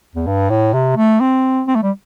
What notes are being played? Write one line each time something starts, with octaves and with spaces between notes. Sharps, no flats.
E2
G2
A2
C3
A3
C4
C4
A3
G3